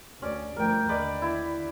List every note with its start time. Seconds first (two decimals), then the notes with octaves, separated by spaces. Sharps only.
0.22 D2 C#4 D5
0.56 G1 F3 A3 A#4 G5
0.89 D#2 D3 B4 D5 D#5
1.22 E4